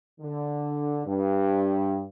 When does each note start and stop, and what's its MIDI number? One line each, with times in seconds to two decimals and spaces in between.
0.21 1.01 50
1.06 2.01 43